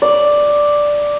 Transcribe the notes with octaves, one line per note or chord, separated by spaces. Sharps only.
D5